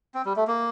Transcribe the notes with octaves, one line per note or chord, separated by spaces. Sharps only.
C4
G3
A3
A#3